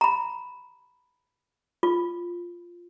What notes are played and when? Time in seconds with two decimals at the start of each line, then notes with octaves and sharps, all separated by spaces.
0.01 A#5 B5
1.83 F4